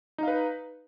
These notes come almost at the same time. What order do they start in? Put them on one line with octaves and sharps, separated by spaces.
D#4 F5 B4